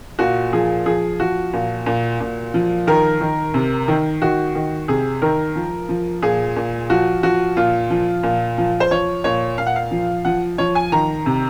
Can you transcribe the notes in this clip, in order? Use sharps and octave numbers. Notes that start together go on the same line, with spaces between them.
A#2 F#4
F3 G#4
F3 G#4
F3 F#4
A#2
A#2
A#2
F3
D#3 A#4
D#3
C3
D#3
D#3 F#4
D#3
C3 G#4
D#3 A#4
F3
F3
A#2 G#4
A#2
F3 F#4
F3 F#4
A#2 F4
F3
A#2
F3
C5
F3 C#5
A#2 C#5
A#2 F5
F#5
F5
F3
F3 F#5
F3 C#5
G#5
D#3 A#5
C3